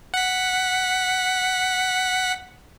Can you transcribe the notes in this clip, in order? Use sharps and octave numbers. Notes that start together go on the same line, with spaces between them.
F#5 B6